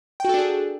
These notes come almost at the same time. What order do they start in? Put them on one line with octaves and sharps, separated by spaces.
G5 F#4 A4 D4 G#4